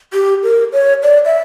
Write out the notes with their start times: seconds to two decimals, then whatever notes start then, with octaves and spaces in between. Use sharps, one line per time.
0.13 G4
0.43 A#4
0.73 C#5
1.03 D5
1.25 E5